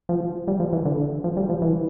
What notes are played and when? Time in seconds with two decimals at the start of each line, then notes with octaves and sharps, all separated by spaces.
0.09 F3
0.48 G3
0.60 F3
0.73 E3
0.85 D3
1.24 F3
1.37 G3
1.49 F3
1.62 E3